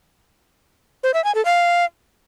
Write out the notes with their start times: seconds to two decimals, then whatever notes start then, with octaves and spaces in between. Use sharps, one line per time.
1.03 C5
1.14 E5
1.24 G#5
1.35 A4
1.45 F5